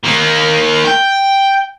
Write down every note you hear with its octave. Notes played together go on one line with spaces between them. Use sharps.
D#3 A#3
G5